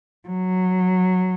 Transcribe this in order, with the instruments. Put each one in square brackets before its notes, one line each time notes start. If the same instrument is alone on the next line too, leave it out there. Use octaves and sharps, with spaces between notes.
[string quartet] F#3